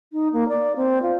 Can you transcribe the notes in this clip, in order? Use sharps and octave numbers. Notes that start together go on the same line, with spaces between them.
D#4
A#3
D5
C4
F4